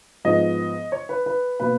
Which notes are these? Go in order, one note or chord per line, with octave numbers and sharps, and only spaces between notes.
G#2 F3 B3 D#5
C#5
B4
B4
B2 A#3 B4